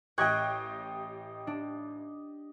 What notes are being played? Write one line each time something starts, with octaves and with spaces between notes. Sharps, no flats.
A1 G4 D#5 G5 C#6 F#6 G#6
D4